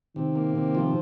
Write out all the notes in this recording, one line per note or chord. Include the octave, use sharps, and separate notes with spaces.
C3 D#3
A#3
C3
F3